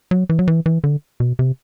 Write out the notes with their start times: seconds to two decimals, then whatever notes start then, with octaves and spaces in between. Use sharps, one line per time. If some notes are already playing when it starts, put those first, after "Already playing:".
0.11 F#3
0.30 E3
0.39 F#3
0.48 E3
0.66 E3
0.84 D3
1.20 B2
1.39 C3